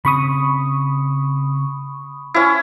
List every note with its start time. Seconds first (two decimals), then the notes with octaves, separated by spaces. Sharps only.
0.05 C#3 C4 B5 C#6 D#6
2.34 C#4 E4